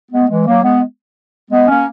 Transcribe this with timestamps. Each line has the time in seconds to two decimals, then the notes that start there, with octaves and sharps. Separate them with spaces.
0.11 G#3 B3
0.29 E3 G#3
0.46 F#3 A#3
0.63 G#3 B3
1.50 G#3 B3
1.68 A#3 C#4